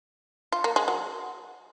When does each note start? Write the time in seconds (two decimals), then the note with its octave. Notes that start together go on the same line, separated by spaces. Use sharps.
0.52 F4
0.64 A#3
0.76 G#3
0.88 F#3